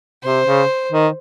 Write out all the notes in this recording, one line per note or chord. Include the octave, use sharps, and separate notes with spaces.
C3 C5
C#3
D#3